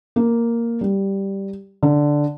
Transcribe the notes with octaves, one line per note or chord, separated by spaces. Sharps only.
A#3
G3
D3